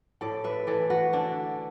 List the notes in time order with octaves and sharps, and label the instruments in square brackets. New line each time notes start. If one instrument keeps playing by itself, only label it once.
[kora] A2 A4 D5
B4 E5
E3 A4 D5
F#4 B4
D3 D4